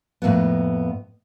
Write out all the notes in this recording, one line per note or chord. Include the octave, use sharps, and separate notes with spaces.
F2 A2 A#3 B3